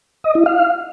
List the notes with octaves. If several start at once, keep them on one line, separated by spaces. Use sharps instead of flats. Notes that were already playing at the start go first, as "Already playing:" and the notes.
D#5
E4
F5